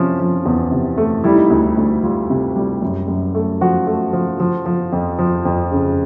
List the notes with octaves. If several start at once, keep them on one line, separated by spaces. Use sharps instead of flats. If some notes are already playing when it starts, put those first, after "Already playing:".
Already playing: C3 F3 C#4
F3
E2
C3
A3
G3 E4
D#4
D2 E4
D2
G3 F4
C3
G3
F#2
F#2
A3
F3 F#4
A3
F3
F3
F3
F2
F3
F2
C#3